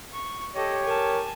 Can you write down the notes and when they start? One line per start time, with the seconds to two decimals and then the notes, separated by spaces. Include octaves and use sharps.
0.12 C#6
0.56 G4 A4 C#5 D#5
0.84 A#4 G#5 A5